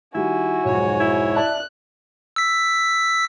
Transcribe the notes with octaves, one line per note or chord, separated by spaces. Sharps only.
D#3 G3 E4 F#4 G#5
B1 F2 G#2 C#5
E4
D5 E5 A5 F#6
E6 B6